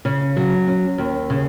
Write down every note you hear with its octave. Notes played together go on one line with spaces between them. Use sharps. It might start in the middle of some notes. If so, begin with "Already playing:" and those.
C#3
F#3
C#4
D#2
C#3